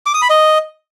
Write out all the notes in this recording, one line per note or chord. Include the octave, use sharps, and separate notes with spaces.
D6
D#6
B5
D#5